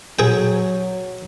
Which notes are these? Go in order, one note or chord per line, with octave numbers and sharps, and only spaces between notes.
F#3 G#4 G5